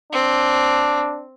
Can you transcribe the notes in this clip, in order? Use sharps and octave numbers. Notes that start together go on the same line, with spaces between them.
C4 D4